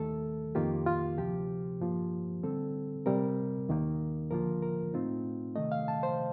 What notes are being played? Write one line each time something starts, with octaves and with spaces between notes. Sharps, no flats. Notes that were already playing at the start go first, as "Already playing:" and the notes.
Already playing: D#2 D#3 A3 A4
F2 D#3 A#3 F4 G4
F4
D2 C3 F3 G4
G2 F3 A#3 F4
D3 G3 C4 A4
C3 G3 C4 A#4
D#2 D#3 A#3 D#4
D2 D3 F3 A#3 F4 A#4
A#4
A2 A3 C4 D#4 F4
C3 D#3 A3 D#5
F5
A5
C5